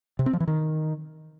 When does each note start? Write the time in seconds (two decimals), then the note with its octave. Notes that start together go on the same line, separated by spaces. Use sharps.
0.19 C3
0.26 C4
0.33 F3
0.40 E3
0.48 D#3